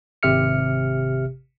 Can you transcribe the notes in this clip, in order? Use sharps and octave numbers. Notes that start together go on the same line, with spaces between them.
G#1 C3 G4 E5 F6 C#7